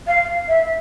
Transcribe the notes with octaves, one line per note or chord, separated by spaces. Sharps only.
F5
E5